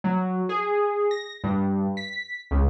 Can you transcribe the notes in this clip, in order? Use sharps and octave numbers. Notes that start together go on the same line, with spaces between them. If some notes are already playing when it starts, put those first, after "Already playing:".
F#3
G#4
A#6
G2
B6
C#2